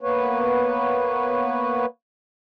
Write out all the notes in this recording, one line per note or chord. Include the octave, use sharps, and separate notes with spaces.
A#3 B3 B4 C#5